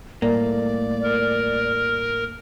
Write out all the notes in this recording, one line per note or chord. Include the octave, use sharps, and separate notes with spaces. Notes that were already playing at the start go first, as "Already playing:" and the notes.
A2 G3 A3 A#3 D5
A#4